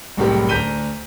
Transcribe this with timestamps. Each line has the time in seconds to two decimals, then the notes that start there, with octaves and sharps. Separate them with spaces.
0.17 F#1 C2 A2 C#4 G4 A#4
0.49 D2 A#5 G6 B6 D#7 G7